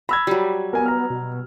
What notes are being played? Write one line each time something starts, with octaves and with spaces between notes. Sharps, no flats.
A#5 B5 E6 G#6
F#3 G3
B3 A#4 G#5
A#5 F6
B2